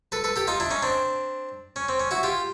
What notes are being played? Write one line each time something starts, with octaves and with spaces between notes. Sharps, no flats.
A4 B4
A4 B4
G4 A4
D#4 F4
D4 E4
C#4 D#4
C4 D4
C#4
C4
C#4
E4 F#4
F4 G4